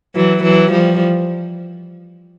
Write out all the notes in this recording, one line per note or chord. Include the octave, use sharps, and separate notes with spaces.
E3 F#3
E3 F#3
F3 G3